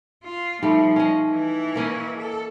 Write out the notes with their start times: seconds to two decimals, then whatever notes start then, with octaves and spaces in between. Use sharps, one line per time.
0.25 F4
0.63 F3 G3 A3 D#4
0.96 C#4 D#5
1.30 E3 E4
1.76 A#3 C#4 D#5
2.17 A4